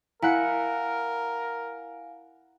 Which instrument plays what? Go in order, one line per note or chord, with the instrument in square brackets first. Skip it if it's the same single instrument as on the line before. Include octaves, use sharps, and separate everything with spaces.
[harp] E4 F#5 C#7 [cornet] A#4 [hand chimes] F5 G#5 A#5